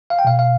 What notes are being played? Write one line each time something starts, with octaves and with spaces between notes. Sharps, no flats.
F5
G5
B2 F5
F5